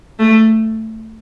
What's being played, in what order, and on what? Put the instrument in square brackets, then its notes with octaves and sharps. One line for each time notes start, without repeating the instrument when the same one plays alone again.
[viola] A3